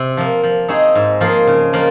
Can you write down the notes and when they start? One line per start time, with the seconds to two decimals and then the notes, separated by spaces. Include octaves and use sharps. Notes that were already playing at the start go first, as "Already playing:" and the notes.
Already playing: C3
0.17 F3 A#3
0.43 F3
0.68 C4 D#4 G#4 C#5
0.95 G#2
1.21 F3 A#3 F4 G#4
1.47 C#3
1.73 F3 A#3 F4